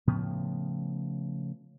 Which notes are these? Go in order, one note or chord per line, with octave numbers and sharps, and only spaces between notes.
A2 C#3 F3 B3